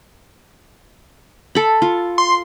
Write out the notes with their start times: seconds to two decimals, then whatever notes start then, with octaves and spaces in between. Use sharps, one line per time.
1.55 A4 B5
1.82 F4
2.18 C6